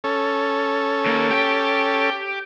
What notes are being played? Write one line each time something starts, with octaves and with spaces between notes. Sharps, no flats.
C#4 A4
D#2 A#3
G4 G5